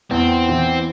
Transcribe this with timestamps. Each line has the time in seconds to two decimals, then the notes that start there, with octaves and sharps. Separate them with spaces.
0.11 E2 C4
0.49 E3